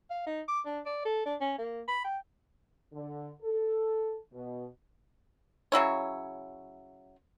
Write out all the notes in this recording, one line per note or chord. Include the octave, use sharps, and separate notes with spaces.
F5
D#4
D6
D4
D5
A4
D4
C#4
A#3
B5
G5
D3
A4
B2
C#3 F#3 E4 C#5